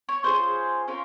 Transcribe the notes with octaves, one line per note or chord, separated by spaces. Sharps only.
C#5
C#4 F4 G#4 C5
C#4 F4 A#4